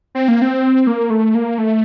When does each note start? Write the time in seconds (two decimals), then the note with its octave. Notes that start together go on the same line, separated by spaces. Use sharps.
0.15 C4
0.28 A#3
0.42 C4
0.87 A#3
1.10 A3
1.35 A#3
1.58 A3